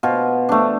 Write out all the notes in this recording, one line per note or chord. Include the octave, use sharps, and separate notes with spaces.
B2 F4
A3 D4